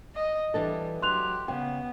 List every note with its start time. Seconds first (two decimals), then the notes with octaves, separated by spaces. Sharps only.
0.15 D#5
0.54 E3 G3 D4 A4
1.02 F#3 G4 C6 F#6 F7
1.48 C#3 B3 G5